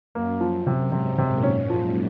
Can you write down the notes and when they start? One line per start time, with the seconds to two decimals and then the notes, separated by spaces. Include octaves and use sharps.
0.15 F#2 A#3
0.41 F3
0.67 C3
0.92 G#2 C3
1.18 C3
1.30 A#2
1.43 C#4
1.70 F3